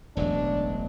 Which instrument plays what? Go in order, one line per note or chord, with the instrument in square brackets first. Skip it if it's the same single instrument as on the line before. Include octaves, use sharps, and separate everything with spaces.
[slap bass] E1 A1 F#3 [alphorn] D4